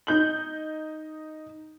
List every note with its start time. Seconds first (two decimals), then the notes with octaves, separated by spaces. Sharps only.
0.07 D#4 G6 F#7